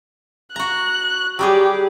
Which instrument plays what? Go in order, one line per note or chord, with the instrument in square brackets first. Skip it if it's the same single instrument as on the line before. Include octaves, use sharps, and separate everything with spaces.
[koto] F#4 A#5 [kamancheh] F#6
[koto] F#3 G3 G#4 [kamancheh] G4